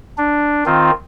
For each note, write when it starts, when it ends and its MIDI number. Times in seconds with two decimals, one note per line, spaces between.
0.18 0.64 62
0.66 0.91 51
0.66 0.91 60
0.66 0.91 65